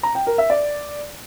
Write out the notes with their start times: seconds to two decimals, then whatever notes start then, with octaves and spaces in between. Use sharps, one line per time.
0.03 A#5
0.15 G5
0.27 A#4
0.38 E5
0.50 D5